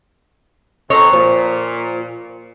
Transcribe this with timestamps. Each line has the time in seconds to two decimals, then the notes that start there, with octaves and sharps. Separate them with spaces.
0.90 F2 C4 D#4 A4 C#5 A#5
1.13 A#2 F3